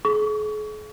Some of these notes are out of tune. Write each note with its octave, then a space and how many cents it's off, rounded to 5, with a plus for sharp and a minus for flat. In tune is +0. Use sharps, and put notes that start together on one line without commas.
G#4 +40 C#6 +35